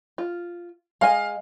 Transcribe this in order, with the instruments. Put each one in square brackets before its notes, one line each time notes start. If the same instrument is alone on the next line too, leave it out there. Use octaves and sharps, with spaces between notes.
[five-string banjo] F4
[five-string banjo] G#3 D#5 G#5 [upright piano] F5